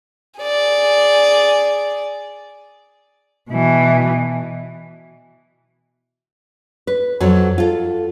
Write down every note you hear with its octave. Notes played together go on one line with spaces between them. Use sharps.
G#4 D5
B2 E3
B4
F2 F#3
F4 A4